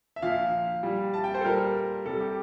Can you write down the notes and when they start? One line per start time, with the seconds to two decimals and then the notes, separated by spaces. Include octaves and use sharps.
0.16 E5
0.22 A#2 F3 F5
0.83 A#2 G3
1.14 A5
1.24 G5
1.34 C5
1.41 A4
1.44 A#2 G3 A#4
2.05 C3 G3 A4
2.20 G4